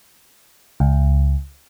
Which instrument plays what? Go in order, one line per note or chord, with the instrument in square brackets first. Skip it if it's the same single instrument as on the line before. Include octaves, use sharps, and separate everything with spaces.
[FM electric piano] C#2